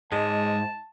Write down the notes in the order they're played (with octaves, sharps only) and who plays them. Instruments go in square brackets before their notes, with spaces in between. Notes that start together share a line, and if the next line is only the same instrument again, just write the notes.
[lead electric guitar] G#2 [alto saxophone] G#3 [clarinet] A5